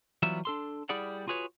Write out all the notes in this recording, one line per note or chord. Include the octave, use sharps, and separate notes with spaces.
E3 F#3 G3 B3 F4 E5
D4 A4 C6
G3 E4 G#4 D5 F#5
F4 F#4 G#4 B4 C#5